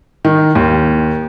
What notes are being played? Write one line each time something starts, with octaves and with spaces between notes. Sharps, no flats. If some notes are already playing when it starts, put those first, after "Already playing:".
D#3
D#2